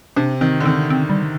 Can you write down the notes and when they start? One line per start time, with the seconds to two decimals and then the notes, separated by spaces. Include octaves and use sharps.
0.16 C3 D4
0.41 D#3 C4
0.60 D3
0.66 D#3 C4
0.90 C4
1.10 G3